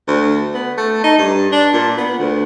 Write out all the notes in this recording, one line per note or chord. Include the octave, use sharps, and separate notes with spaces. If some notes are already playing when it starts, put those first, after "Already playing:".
D2
B3
A3
D#4
G2
D4
A#2
B3
D2